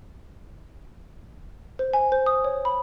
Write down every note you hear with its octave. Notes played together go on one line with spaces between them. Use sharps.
C5
G#5
C5
D#6
C#5
B5